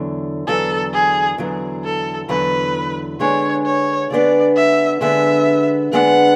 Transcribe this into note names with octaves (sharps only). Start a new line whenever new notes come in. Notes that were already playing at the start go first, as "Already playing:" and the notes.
Already playing: E2 D3 F#3
E2 D3 F#3 A4
G#4
E2 D3 F#3
A4
E2 D3 F#3 B4
D3 G#3 B3 D4 C#5
C#5
D3 G#3 B3 D4 D5
E5
D3 G#3 B3 D4 E5
D3 G#3 B3 D4 F#5